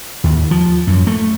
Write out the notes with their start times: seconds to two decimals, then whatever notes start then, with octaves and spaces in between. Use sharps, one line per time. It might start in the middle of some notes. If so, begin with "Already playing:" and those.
0.24 D#2
0.51 F3
0.87 F#2
1.07 A3